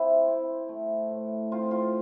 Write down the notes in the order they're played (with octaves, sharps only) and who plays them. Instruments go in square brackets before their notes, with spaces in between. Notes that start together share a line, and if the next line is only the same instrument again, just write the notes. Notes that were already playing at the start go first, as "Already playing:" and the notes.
Already playing: [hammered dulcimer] C4 E4
C4
A3
A2
C4 F4
F4